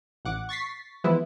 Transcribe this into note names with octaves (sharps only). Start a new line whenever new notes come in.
A1 F#5 D6
C#6 A6 B6 C7
E3 F3 G#3 B3 E4